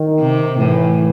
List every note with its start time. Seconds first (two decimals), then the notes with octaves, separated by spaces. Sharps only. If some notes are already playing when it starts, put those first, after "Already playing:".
Already playing: D#3
0.19 C3
0.59 A2 E3